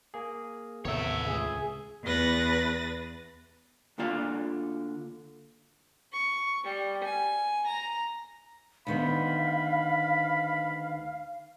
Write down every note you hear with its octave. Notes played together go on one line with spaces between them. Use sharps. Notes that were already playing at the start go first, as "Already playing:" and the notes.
A#3 G#4
A1 D#2 C3 A3 B3 C#5 E5
C#2 G#4
E2 B4 A6 A#6
D2 D3 A#3 F4 D5 F5
C#6
G3
G#5
A#5
D2 D#3 B3 F5 B5